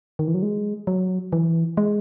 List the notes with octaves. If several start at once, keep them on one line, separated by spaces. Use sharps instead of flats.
D#3
E3
F#3
G#3
F#3
E3
G#3